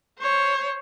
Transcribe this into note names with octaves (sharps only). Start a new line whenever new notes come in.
C5 C#5